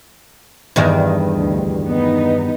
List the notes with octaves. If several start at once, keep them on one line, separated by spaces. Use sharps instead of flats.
E2 G2 D#3
D2
B3 D#4